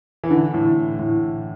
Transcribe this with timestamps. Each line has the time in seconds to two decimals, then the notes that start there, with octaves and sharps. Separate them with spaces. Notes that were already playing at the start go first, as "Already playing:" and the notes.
0.24 E3
0.30 D3
0.54 A2
0.99 A2